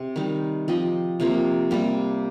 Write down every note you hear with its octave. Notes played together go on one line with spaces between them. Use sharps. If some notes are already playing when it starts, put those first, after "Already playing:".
Already playing: C3 C4
D#3 G3 D#4
F3 C4 G4 D#5
C3 F3 A#3
C3 G3 A#3